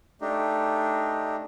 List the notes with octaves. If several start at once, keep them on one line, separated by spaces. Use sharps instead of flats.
A3 D4 D#4 G4